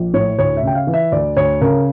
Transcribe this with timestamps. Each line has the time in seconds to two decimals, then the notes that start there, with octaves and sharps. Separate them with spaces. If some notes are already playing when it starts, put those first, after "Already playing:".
Already playing: A#1
0.14 A2 C#5
0.39 D2 C#5
0.57 E5
0.63 C#3 G5
0.75 F5
0.87 E3
0.94 E5
1.12 D2 D5
1.37 D2 C#5
1.61 C#3 A#4